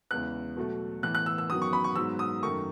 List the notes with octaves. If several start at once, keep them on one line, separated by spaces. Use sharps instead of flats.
E2 C#3 E3 G#3 B3 F#6
B2 F#3 A3
A2 E3 B3 F#6
F#6
E6
E6
F#2 D#3 F#3 B3 D#6
C#6
B5
C#6
G#2 F#3 B3 E6
D#6
F#2 D#3 A3 C#6